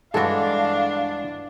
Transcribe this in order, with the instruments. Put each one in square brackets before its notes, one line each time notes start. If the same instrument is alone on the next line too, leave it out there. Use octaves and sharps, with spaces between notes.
[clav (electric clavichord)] G2 E3 G#3 [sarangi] D4 [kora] F#4 A4 [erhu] F5